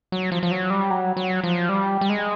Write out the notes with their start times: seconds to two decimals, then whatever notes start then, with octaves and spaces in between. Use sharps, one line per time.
0.12 F#3
0.32 F3
0.43 F3
0.51 F#3
0.70 G3
0.91 F#3
1.17 F#3
1.44 F3
1.69 G3
2.01 G3
2.09 G#3